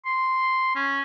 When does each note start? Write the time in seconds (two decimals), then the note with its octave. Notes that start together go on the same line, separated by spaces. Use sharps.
0.06 C6
0.76 C#4